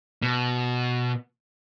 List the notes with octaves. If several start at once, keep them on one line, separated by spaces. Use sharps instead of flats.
B2